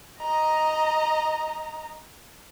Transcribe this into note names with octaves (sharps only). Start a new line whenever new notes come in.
D#5 A#5